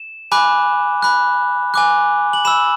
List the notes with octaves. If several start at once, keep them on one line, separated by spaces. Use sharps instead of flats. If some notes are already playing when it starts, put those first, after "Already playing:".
Already playing: E7
G#5 B5 D6 F#6
B5 F#6
G#5 D6 F#6
F#7
B5 E6 E7